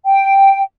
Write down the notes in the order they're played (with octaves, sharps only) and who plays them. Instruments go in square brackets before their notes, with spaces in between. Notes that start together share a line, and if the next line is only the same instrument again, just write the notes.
[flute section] G5